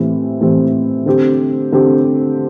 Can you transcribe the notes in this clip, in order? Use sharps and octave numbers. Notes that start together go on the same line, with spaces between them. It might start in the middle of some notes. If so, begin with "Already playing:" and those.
Already playing: A2 E3 C4 G4
A2 E3 C4 G4
D3 C4 G4
D3 C4 G4